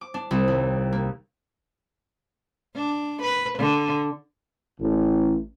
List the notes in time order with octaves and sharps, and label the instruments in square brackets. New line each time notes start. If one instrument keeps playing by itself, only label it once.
[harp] D6
D4
C2
D#2
A#3
[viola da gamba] D4
B4
D3
[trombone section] A1